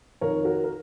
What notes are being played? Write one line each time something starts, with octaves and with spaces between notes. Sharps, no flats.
F2 D#3 A#4 C#5
F#4 A#4
A#4